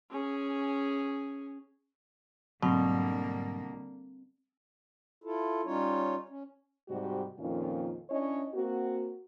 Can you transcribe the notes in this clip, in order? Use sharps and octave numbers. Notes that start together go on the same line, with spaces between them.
C#4 G#4
G#2 B2 D3 F#3 G3 A#3 C4
E4 F4 A4
G3 C#4 D#4 F4 C#5
C#4
G#2 C3 G3 F#4 G4
F2 A#2 D#3 C#4 F4
C#4 D4 E4 C#5 D#5
A#3 C4 F#4